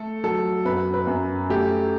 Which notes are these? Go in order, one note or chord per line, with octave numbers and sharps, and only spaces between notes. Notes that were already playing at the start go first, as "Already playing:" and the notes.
Already playing: A3 A4
F#3 A4
F#2 B4
B4
F#2
A3 G4